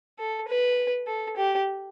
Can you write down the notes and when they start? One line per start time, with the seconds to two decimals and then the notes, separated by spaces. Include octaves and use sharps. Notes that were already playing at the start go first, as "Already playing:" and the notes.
0.19 A4
0.48 B4
1.07 A4
1.37 G4